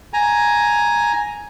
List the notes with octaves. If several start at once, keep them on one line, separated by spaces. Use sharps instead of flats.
G#5 A#5